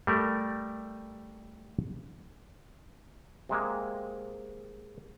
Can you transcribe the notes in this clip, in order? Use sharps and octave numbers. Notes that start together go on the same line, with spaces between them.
G3 A3 A#4
C3 G#3 A#3